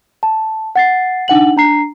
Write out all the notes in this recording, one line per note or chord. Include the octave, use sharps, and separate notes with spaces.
A5
F#5 A6 C7
D4 D#4 F#5 F#7
D4 A#5 C7